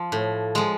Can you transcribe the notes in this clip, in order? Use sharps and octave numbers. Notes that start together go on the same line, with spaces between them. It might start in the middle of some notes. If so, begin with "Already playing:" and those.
Already playing: F3
A2
F3 G#3